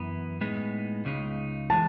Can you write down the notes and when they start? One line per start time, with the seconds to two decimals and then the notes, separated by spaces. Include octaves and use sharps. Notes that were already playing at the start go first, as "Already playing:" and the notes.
Already playing: F#2 E3 B3
0.41 A2 G#3 B3 D#4
1.05 C#2 C#3 G#3 D#4
1.70 E3 G#3 A5